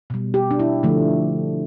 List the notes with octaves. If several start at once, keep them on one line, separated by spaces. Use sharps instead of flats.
B2 G3
G4
D4
E4
D3 F3 A3